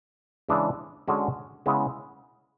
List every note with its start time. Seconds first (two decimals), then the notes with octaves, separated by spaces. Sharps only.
0.49 C#3 E3 G#3 D4
1.08 D3 G#3 C#4 F#4
1.66 C#3 G#3 B3 E4